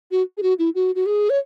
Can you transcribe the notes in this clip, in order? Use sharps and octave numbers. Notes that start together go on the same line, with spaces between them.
F#4
G#4
F#4
E4
F#4
F#4
G#4
C#5